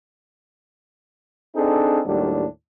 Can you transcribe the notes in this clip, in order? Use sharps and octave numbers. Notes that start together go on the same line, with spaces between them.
C4 D4 D#4 G#4 A4
D#2 A2 F#3 G3 D4